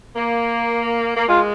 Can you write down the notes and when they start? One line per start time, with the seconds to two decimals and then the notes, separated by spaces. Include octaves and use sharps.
0.15 A#3
1.15 A#3
1.28 G#3 F4